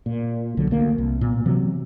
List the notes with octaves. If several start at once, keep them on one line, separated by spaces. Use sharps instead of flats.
A#2
B1 D3 F#3
D2 A#3
C2
A#2 B3
C3 E3 F#3